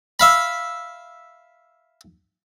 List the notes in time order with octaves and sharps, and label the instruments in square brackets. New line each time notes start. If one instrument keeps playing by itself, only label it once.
[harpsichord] E5 F5 B5